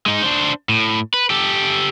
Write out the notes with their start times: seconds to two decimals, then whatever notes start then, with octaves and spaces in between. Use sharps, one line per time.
0.06 G#3 D#4
0.23 D4 C5
0.69 A2
1.14 B4
1.30 G4 A4